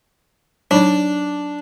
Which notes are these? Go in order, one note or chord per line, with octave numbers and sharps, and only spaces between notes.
F#3 D4 D#4 D5